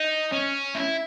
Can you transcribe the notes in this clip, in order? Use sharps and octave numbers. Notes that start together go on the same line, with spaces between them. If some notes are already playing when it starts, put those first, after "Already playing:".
Already playing: D#4
C#4
E4